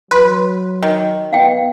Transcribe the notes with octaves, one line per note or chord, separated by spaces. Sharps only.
F#3 B4 C6
D#3
B3 F5 G5